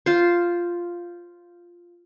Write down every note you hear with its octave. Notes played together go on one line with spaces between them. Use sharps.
F4 C5